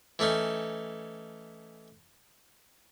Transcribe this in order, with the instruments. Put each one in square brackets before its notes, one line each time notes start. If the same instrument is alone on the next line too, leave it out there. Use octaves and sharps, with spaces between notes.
[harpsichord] E3 A3 C#4 D#4